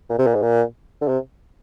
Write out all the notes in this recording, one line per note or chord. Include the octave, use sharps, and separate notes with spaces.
A#2
C3
A#2
G#2
A#2
D3
C3